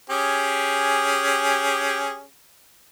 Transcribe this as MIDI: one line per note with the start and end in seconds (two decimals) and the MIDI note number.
0.10 2.23 61
0.10 2.23 67
0.10 2.23 68